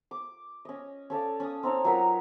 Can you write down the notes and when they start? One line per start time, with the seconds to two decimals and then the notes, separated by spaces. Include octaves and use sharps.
0.11 D6
0.65 C#4 D#5
1.10 C#4 A4 D5 F5
1.40 C#4 D#6
1.63 C4 D#4 C#5
1.84 F#3 F4 A#4 B4